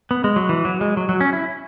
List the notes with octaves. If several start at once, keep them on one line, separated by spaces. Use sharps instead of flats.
B3
G#3
F#3
E3
F#3
G#3
F#3
F#3
C#4
E4